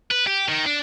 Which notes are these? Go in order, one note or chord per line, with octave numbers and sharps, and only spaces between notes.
B4
G4
D#3
D4